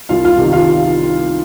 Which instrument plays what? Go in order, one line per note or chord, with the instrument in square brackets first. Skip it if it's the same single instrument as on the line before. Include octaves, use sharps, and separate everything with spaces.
[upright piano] C2 F4 F5
F4 F5
C3 D#3
F4 F5